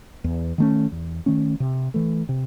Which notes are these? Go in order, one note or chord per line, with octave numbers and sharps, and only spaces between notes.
E2
D#3 A3 C#4
E2
D#3 A3 C#4
C3
E3 A3
C3